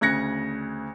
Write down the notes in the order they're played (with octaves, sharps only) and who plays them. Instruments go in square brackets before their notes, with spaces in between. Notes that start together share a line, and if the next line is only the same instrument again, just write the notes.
[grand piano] D2 C#3 F#6 G#6 A#6 C#7